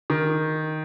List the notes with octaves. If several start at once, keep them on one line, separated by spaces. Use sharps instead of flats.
D#3